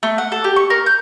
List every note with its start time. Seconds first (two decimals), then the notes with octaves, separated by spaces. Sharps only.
0.03 A3
0.18 F#5
0.32 A4
0.44 G4
0.56 C#6
0.70 A#4
0.86 G6